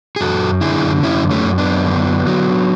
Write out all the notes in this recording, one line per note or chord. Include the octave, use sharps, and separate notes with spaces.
G#4
F#2 F#4 A4
D3 E4 G#4
F#2 C#4 E4
A3 C#4
F#2
B3 D4
D3
F#3